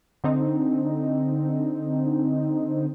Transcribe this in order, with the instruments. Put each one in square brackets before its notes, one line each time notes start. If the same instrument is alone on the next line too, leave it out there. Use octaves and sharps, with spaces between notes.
[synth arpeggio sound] D3 C4 D#4